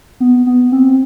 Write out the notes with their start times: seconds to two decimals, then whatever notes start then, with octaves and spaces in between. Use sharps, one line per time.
0.20 B3
0.47 B3
0.72 C4